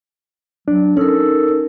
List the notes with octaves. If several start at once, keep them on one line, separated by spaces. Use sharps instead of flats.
F#3 D4
C#4 D#4 A4 A#4